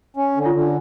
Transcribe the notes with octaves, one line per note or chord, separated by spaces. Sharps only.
C#4
D3
F4
D3